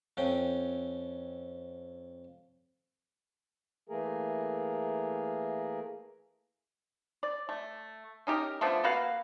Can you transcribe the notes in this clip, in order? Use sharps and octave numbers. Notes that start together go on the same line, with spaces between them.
F2 C#4 G5
E3 A3 A#3 G#4 A#4
D5
A3
C#4 D#4 G4 A#4
D3 F3 A3 B3
A#3 F#4 B4 F5